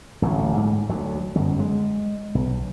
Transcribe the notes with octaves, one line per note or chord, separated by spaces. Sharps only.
D1 A1 A2 F#3
G#2
D2 F#3
G1 F#2
G#3
B1